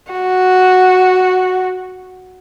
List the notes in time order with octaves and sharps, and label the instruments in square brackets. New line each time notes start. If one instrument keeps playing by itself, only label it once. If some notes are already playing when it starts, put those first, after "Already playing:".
[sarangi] F#4